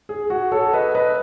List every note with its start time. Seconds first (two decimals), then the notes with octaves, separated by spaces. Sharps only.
0.09 G#4
0.30 F#4
0.52 A4 C#5
0.73 B4 D#5
0.94 B4 D#5